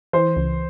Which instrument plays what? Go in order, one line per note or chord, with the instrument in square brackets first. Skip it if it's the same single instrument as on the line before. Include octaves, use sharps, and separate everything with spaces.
[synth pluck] E3 [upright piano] C5
[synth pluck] C#2